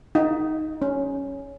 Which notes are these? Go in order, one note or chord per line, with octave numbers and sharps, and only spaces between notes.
D#4
C#4